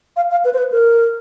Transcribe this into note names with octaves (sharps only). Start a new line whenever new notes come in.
F5
F5
B4
C5
B4
A#4